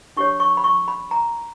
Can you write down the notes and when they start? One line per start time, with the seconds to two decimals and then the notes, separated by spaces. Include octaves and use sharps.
0.17 D4 G4 C#5 C#6
0.40 C#6
0.57 B5
0.64 C#6
0.88 B5
1.11 A#5